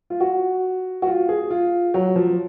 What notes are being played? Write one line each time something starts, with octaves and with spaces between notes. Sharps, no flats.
F4
F#4
F#4
F4
G#4
F4
F#3
F3